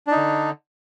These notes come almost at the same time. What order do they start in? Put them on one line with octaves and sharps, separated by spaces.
D4 D#4 D3